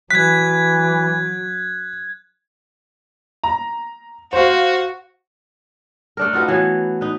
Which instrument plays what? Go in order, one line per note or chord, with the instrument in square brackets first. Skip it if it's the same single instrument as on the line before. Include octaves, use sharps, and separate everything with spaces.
[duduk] E3 [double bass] F#3 [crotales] F#6 G#6 [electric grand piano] B6
[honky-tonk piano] A#5
[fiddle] F#4 [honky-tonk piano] C5 F5
[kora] A3 D4 A#4
D#4 F4 F#4 B4
E3 F#3 B3
D#4 B4